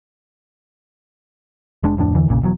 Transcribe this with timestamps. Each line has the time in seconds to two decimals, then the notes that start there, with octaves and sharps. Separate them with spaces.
1.83 F1 G#3 D4
1.97 D1 F2 A2 D4
2.14 E2 D3 E3
2.28 E1 A#1 A#2 C#3
2.42 E1 E2 F#3